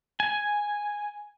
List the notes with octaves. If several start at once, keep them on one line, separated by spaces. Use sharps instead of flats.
G#5